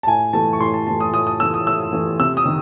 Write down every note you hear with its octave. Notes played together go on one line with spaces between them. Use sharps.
A5
A2 G#5
E3 A3 A5
C#6
A2 C6
A5
E3 A3 A5
D#6
A2 D#6
D#6
E3 A3 E6
D#6
A2 E6
E3 A3
C3 E6
D#6
D#3